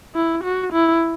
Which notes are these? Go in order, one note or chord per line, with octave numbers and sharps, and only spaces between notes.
E4
F#4
E4